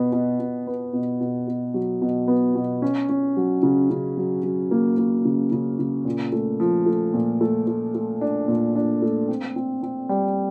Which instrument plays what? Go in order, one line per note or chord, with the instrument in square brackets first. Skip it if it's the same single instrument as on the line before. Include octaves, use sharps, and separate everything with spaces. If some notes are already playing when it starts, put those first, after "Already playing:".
Already playing: [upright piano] B2 B3
B2
B2
B3
B2
B2
B2
F#3
B2
B3
B2
C#4
C#4
F#3
C#3
C#3
F#3
F#3
A#3
A#3
C#3
C#3
C#3
A#2
A3
F3
A3
A#2
A3
A3
A3
D4
A#2
D4
A3
C4
C4
C4
G3